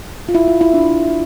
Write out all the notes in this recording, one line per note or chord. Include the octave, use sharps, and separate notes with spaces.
F4
E4
F4
E4
D4